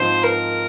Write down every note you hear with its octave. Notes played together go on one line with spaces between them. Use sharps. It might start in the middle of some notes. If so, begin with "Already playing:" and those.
Already playing: G#2 F3 C4 D#4 C5
A#4